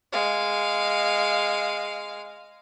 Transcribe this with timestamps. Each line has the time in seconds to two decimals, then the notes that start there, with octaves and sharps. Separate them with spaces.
0.13 G#3 F5